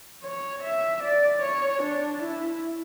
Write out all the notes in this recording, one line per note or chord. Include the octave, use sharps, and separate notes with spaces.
C#5
E5
D5
C#5
D4
E4